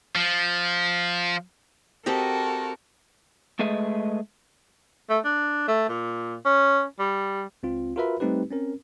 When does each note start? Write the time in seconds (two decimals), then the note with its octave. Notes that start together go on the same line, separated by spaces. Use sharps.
0.15 F3
2.06 C4 F#4 G4 A4 A#4 D#5
3.59 G#3 A3 G#4 B4 D#5 E5
5.10 A3
5.25 D4
5.68 A3
5.89 A#2
6.45 C#4
6.99 G3
7.63 C#2 C4 F4
7.96 F4 F#4 A#4 B4 E5 B5
8.20 G3 A3 C4 D#4 G4 B4
8.50 C4 C#4 A#4